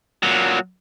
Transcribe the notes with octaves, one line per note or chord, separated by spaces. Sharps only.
A#2 F#3